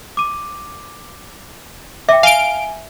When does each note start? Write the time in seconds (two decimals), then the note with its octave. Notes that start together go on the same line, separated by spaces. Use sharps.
0.17 D6 D#7
2.09 E5 G5 D6
2.23 F5 G#5 D7 D#7 G7